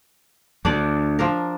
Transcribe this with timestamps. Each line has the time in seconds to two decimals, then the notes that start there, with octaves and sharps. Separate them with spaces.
0.65 D2 D4 D5
1.19 F3 D4 A#4